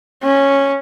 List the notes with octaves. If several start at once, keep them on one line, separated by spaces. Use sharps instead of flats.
C#4